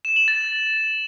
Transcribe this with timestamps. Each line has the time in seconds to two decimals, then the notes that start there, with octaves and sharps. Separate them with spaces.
0.05 E7
0.16 F#7
0.28 A6